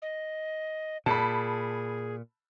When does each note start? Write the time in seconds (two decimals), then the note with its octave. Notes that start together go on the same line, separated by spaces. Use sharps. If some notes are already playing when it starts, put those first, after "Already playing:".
0.02 D#5
1.06 A#2 G#4 A5 B5